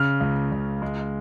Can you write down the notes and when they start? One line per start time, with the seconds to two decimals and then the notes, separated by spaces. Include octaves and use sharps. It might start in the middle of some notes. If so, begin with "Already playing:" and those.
Already playing: C#3 F6
0.20 C#2
0.52 C#2
0.82 G#3